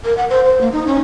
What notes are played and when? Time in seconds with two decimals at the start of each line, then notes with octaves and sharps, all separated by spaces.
0.05 A#4
0.17 F#5
0.30 C5
0.45 C5
0.61 A#3
0.72 D#4
0.87 C#4